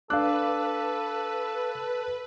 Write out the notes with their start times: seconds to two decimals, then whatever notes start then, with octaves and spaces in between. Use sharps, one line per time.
0.10 D4 A4 B4 F5 D6 F#6